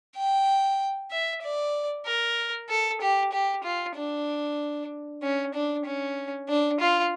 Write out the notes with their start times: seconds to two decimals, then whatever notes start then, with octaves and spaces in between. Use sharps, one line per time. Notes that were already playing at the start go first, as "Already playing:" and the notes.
0.16 G5
1.11 E5
1.42 D5
2.06 A#4
2.69 A4
3.01 G4
3.32 G4
3.64 F4
3.95 D4
5.22 C#4
5.54 D4
5.85 C#4
6.48 D4
6.80 F4